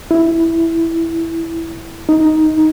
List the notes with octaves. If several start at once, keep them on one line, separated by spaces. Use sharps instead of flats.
E4
D#4